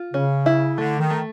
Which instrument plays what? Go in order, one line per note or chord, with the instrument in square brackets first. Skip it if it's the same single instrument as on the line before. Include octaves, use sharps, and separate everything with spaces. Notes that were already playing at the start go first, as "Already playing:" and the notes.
Already playing: [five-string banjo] F4
[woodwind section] C#3 [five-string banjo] C#4
[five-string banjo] E4
[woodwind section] D3 [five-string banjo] A3
[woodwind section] D#3
[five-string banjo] A3